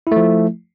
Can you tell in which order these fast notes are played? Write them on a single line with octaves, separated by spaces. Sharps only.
E4 A3 F3